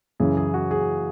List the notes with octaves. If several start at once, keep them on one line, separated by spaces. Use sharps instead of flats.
F#2 C#3 E3 G#4
G#4
F#4
G#4